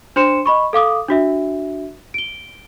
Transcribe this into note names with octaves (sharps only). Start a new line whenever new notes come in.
D4 C5 C6 C#7 E7
D#5 B5 C#6
A4 F5 D6 D#6
D4 F#4 E5
D7 G7